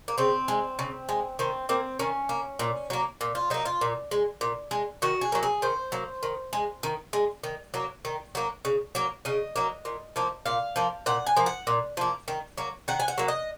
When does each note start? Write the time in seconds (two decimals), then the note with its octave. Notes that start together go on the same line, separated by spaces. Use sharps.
0.08 A#3
0.18 C#3 C4
0.48 G#3
0.79 C#3
1.09 G#3
1.39 D#3 C4
1.69 A#3 C4
1.99 D#3 C#4
2.29 A#3
2.59 A#2
2.90 F#3 A#3
3.21 A#2
3.35 F4
3.50 F#3 A#3 D#4
3.65 F4
3.81 A#2
4.11 G#3
4.41 A#2
4.71 G#3
5.02 D#3 F#4
5.21 G#4
5.32 F#3 A#3
5.43 G#4
5.62 D#3 C5
5.92 F#3 A#3
6.23 D#3
6.53 G#3
6.83 D#3
7.13 G#3
7.43 D#3
7.74 F#3 A#3
8.05 D#3
8.35 F#3 A#3
8.65 C#3
8.95 F#3 A#3
9.25 C#3 D#5
9.56 F#3 A#3
9.85 A#2
10.16 F3 A#3
10.46 A#2 F5
10.76 F3 A#3
11.06 A#2 F#5
11.26 G#5
11.37 F3 A#3
11.46 F#5
11.67 A#2
11.97 F3 A#3
12.28 D#3
12.58 F#3 A#3
12.88 D#3 F#5
13.00 G#5
13.08 F#5
13.18 F#3 A#3
13.28 D#5